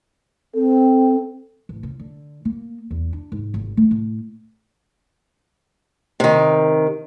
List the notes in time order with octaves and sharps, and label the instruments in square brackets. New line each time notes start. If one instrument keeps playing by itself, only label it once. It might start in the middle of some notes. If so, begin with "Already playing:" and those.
[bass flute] C4 [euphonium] A4
[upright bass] A1
C#3
D3
A#3
E2
D4
G#2
G#1
A3
A2
[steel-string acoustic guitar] C3 D#3